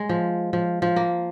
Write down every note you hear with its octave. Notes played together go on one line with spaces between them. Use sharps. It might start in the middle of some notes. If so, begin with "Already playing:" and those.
Already playing: G#3
F3
F3
F3
A#3